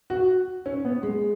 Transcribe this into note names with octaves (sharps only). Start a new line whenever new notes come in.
F#4
C#4
B3
G#3